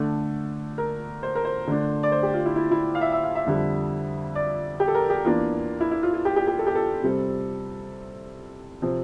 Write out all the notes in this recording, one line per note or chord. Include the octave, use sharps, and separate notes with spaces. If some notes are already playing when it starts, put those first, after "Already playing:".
Already playing: D3 A3 D4 A4
A#4
C5
A#4
C5
D3 A3 D4
D5
C5
G4
F4
E4
E4
E4
F5
E5
E5
F5
E5
F2 D3 G3
D5
G4
A4
A#4
G4
E2 E3 A#3 D4 F4
E4
E4
F4
F4
G4
G4
G4
A4
G4
A4
C3 G3 C4
C3 F3 C4